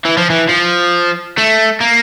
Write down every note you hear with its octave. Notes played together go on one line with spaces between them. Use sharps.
E3
F3
E3
F3
A3
A#3